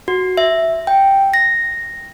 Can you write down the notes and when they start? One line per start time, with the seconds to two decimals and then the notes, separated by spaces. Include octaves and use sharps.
0.08 F#4
0.37 E5
0.87 G5
1.34 A#6